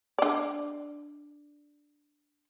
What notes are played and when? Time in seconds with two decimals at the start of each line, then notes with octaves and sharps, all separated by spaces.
0.18 D4 D5